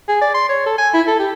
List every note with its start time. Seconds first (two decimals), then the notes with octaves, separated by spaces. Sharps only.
0.08 G#4
0.22 D5
0.35 C6
0.49 C#5
0.66 A4
0.78 G#5
0.94 E4
1.08 A4
1.20 G4